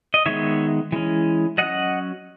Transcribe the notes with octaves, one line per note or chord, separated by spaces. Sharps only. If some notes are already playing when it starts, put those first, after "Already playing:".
D#5
D#3 G#3 B3 C#5 E5
E3 G#3 C#4
F#3 C#4 D#5 F#5